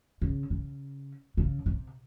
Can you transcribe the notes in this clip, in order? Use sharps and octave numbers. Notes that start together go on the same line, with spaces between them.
C#3
C#3
C#3
C3